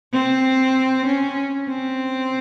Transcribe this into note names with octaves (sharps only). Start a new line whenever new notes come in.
C4
C#4
C4